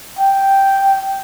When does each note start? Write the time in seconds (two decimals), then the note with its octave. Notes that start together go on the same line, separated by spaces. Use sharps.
0.19 G5